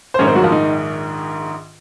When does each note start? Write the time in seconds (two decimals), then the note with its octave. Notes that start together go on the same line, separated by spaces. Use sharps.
0.14 C5
0.19 A#1 G#2 D#3 C#4 C#5
0.27 C4 C5
0.35 F#3 F#4
0.43 F3 F4
0.52 D#4